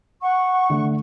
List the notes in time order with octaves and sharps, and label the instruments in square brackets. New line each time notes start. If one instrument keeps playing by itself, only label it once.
[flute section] F#5 C#6
[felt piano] D3 A3